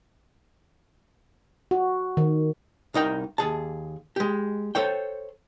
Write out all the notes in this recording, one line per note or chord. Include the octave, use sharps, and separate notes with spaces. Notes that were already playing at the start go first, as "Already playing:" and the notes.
F#4
D#3
C2 D#4 A#4 G5
D#2 G#4 A5
G#3 G4
A4 C5 C#5 G5